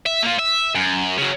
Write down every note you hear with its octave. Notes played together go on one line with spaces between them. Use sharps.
E5
A#3 F4
E5
F#2
C#3 F#3